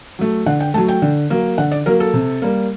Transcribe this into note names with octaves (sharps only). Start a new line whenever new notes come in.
F#3 A3
D3 F#5
G5
F#3 A3 A5
G5
D3
F#3 A#3
D3 F#5
D5
F#3 A#3 A#4
A4
C3
G3 A#3